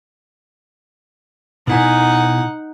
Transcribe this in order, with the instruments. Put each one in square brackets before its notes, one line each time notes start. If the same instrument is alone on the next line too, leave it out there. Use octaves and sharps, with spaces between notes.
[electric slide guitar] B2 E4 G#5 [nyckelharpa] D#4 F#5